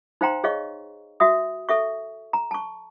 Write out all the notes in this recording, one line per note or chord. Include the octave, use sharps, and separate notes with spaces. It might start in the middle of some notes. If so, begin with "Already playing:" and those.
D#4 C5 F5 G5 A#5 C6
G#4 C#5 D#5 F5 C#6
F#4 E5 D#6
A4 E5 C#6
A#5
A5 C#6